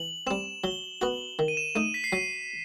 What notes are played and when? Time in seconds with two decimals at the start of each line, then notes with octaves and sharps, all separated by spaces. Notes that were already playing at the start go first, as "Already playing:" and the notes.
Already playing: E3 F#7
0.27 G3 C4 E7
0.63 F#3 G7
1.01 B3 F#4 F#7
1.39 D#3
1.48 D#7
1.57 E7
1.76 A3 D#4 D#7
1.94 B6
2.04 C7
2.12 F#3 D#7